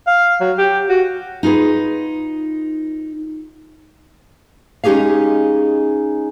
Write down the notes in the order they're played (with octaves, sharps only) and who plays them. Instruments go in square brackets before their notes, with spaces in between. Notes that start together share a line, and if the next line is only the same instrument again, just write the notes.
[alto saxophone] F5
F#3
G4
F#4
[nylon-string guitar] D#4 F4 G#4 B4
G#3 C#4 D#4 G4 G#4 F5